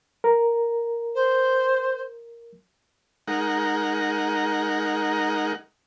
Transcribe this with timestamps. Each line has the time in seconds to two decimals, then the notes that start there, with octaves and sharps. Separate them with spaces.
0.24 A#4
1.14 C5
3.27 G#3 D#4 A#4 F#5